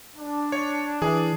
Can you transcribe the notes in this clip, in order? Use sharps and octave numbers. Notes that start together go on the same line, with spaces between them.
D4
C#5
E3 G#4